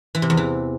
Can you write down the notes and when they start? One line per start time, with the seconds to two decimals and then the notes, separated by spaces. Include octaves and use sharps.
0.15 E3
0.22 C3
0.30 E2
0.37 E3